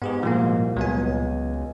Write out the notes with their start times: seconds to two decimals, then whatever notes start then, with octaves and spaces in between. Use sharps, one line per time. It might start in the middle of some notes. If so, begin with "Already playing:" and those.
0.02 G#2 B3 G4 G#4
0.23 C2 A#2 F3 A#3
0.77 C#2 F#3 B3 G#5